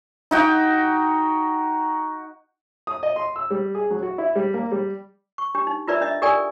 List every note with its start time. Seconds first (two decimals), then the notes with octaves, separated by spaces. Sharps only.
0.31 D#4 F#4 G5
2.87 D#6
3.03 D#5
3.16 C6
3.36 E6
3.50 G3
3.75 G#4
3.91 F#3
4.03 F#4
4.18 E4
4.35 G3
4.54 A#3
4.72 G3
5.38 C#6
5.55 D4 G4
5.67 D#4
5.88 E4 F4 A#4 B4 D5 E5
6.01 D4 D#5 E5
6.22 G4 A4 A#4 D5 G5 G#5